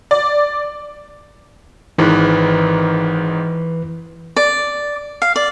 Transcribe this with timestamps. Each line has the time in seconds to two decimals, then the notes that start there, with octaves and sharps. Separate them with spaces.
0.11 D5
1.98 G#1 G#2 D#3 E3 B4
4.36 D5
5.22 F5
5.36 D5